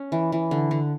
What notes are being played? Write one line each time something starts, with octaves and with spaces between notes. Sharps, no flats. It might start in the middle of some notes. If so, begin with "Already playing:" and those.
Already playing: C#4
E3
E3
D3
D3